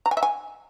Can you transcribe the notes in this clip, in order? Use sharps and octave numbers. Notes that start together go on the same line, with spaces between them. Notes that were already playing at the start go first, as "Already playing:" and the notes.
A#5
G#5
E5
G#5